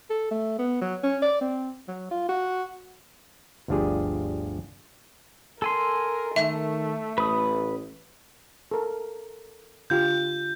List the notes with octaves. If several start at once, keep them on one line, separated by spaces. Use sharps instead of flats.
A4
A3
B3
F#3
C#4
D5
C4
F#3
F4
F#4
G1 D2 F3 D4 G4 G#4
A4 A#4 G#5 C6
D#3 A3 E5
A1 B4 D#6
A4 A#4
D3 F4 G4 G6